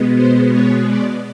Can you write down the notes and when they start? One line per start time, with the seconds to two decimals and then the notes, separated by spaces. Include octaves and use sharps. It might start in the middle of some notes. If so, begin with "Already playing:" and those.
Already playing: B2 G#3 B3
0.15 C5
0.51 C#5
0.87 D5